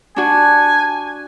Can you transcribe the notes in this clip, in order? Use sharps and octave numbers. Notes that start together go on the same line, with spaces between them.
D4 F#4 G#5